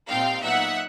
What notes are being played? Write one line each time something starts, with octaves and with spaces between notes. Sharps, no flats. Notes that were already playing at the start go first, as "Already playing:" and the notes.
A#2 G3 C4 D#4 F5 G5
A#2 F#3 B3 D#4 E5 F#5